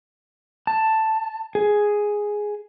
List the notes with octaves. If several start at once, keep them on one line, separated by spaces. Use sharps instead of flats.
A5
G#4